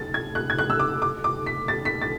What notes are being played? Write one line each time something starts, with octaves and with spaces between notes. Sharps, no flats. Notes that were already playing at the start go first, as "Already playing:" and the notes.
Already playing: A6
G#6
F#6
G#6
F#6
E6
D6
D6
D6
B6
A6
B6
A6